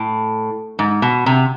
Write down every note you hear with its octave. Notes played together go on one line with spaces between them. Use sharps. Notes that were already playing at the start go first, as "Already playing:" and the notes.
Already playing: A2
G#2
B2
C3